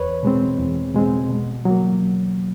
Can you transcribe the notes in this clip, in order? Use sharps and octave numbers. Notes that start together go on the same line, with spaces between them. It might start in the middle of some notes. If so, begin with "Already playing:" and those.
Already playing: E2 B4 C#5
B2 G#3 C4
E2
B2 G#3 C4
B2
F#3 A#3